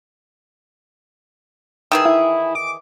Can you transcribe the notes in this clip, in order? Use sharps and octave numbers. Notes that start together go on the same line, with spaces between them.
D#3 E3 G#4 E6
E4
D6